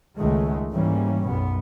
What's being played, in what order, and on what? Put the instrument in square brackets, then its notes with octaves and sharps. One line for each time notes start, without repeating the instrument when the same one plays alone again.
[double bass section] C#2 D#3 G#3 A3
G#2 E3 G3 A#3 C#4
B1 F#2 B3